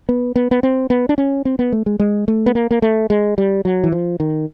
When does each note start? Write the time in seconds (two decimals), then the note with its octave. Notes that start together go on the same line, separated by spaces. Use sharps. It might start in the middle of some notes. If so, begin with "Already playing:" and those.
0.09 B3
0.36 B3
0.51 B3
0.63 C4
0.90 B3
1.09 D4
1.18 C#4
1.45 C4
1.59 B3
1.72 A3
1.86 G#3
2.00 G#3
2.28 A3
2.46 B3
2.55 A#3
2.71 A#3
2.82 A3
3.10 G#3
3.38 G3
3.65 F#3
3.84 E3
3.92 F3
4.20 D#3